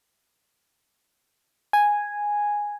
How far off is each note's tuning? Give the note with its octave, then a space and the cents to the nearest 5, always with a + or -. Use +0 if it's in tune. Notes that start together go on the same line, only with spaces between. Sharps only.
G#5 -5